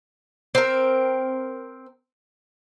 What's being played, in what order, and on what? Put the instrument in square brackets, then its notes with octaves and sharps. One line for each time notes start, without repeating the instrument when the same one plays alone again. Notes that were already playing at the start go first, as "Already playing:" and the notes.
[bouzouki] C4 A#4